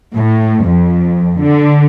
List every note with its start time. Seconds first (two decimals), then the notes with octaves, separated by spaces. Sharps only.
0.17 A2
0.67 F2
1.41 D3